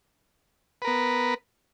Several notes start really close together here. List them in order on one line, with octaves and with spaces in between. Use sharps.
B4 A#4 B3